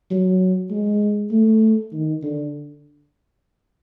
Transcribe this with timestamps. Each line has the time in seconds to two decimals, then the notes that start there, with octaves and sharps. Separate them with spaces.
0.11 F#3
0.71 G#3
1.32 A3
1.92 D#3
2.23 D3